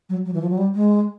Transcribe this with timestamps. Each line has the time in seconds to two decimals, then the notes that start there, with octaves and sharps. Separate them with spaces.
0.09 F#3
0.25 F#3
0.34 E3
0.41 F3
0.50 F#3
0.58 G3
0.75 G#3